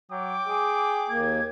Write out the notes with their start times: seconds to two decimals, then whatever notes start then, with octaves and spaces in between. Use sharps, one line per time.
0.11 F#3 G5 D6
0.48 G#4
1.09 D#2 A#3 G#6